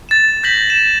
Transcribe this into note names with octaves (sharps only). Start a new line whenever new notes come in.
A6 E7
G6 A#6 B6 F#7
E7